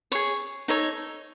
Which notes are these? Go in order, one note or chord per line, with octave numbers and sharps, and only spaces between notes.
G#4 C#5 C#6
D#4 A4 C#5